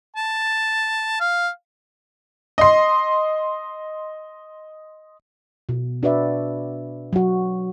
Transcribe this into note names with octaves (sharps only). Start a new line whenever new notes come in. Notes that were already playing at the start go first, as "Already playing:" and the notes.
A5
F5
D#5 C6
B2
D4 F#4 B4 D5 E5
F#3 F#4